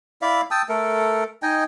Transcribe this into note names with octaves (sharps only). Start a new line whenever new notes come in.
E4 D5 E5 F5
G5 A5 D#6 E6
A3 A4 A#4
D#4 D#5 G5 G#5